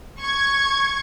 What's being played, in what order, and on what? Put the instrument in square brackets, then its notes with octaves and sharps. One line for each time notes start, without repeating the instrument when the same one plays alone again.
[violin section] C#6 G#6